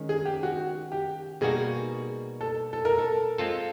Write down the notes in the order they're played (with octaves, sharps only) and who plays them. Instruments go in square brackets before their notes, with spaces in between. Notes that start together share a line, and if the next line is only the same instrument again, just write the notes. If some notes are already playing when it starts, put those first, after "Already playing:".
Already playing: [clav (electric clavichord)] D#3 G#3 C#4
[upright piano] G#4
G4
F#4
G4
[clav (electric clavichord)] B2 G3 A#3 D#4 F#4 [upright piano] G#4
[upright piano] A4
A4
A#4
A4
[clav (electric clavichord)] G#3 C4 F4 A4